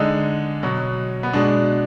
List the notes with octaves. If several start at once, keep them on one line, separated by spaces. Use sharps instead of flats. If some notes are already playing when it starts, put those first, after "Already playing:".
Already playing: D3 G#3 D#4
B2 F#3
B3
B2 G#3 D4